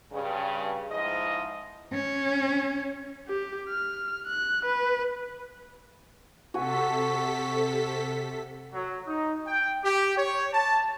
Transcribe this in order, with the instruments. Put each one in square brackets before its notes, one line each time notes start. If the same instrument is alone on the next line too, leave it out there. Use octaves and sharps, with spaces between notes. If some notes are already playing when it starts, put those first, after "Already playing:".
[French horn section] G2 C#3 G#4
G#2 F3 G#3 E4 D#5
[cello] C#4
[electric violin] G4
F6
F#6
B4
[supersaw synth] C3 A4 B6 [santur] F#4 G#5
[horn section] F#3
D#4
G5
G4
C#5
A5